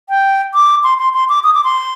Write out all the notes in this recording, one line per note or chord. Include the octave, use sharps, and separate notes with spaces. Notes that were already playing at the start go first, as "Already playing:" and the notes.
G5
D6
C6
C6
C6
D6
D#6
D6
C6